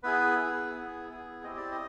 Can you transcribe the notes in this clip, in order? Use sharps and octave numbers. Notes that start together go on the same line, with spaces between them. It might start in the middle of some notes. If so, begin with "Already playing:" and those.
B3 E4 G#4 B4
B3 E4 G#4
B3 E4 G#4
B3 E4 G#4
C4 E4 G4 D#5
D5
D#5